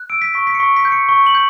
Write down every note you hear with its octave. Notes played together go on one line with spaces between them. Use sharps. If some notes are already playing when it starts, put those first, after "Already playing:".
Already playing: F#6
E6 D7
B6
C#6 B6
B6
C#7
C#6 B6
B6
G6
C#7
C#6
F#7
G6